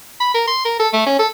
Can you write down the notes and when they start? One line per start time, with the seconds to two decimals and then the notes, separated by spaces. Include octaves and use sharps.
0.20 B5
0.34 A#4
0.48 C6
0.65 A#4
0.80 A4
0.94 A3
1.07 C#4
1.19 A4